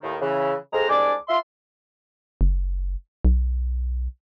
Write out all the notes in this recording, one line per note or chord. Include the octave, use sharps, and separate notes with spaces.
D#2 A2 D#3
C#3 E3
F2 G#3 C5 A#5
C2 G#3 D4 D5 G#5 D6
F4 E5 C6
F#1
B1